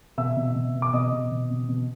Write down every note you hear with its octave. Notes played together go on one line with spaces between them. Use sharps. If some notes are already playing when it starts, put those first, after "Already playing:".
B2 E5 E6
B2
B2
B2
D6
B2 D#5 D#6
B2
B2
B2
B2